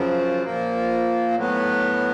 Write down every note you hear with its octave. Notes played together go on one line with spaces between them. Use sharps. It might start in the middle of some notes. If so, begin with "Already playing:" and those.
Already playing: F#2 C#3 F3
A#2 F3 A#3
A2 F#3 B3